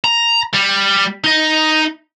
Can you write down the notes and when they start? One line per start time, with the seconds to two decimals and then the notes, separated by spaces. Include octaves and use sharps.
0.04 A#5
0.54 G3
1.24 D#4 D#5